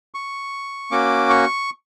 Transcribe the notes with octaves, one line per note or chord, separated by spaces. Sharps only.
C#6
A#3 C#4 F#4 D6
C#6